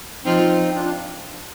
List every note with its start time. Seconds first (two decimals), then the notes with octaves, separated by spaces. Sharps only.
0.25 F3 C4 D#4 F4
0.74 D4 F4
0.85 D4